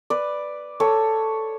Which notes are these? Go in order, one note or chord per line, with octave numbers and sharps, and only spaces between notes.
B4 D5
A4 C#5